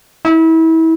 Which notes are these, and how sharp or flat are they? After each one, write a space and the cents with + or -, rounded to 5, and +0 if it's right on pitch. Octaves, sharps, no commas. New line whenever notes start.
E4 -30